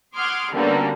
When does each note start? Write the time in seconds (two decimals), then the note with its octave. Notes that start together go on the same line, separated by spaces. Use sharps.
0.15 F#5 C6 D6 D#6 F6 G#6
0.54 D3 F#3 G3 A#3 B3 C#4